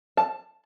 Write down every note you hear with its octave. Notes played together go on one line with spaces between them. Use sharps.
A5